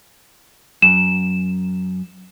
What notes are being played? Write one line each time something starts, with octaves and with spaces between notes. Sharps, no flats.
F#2 E7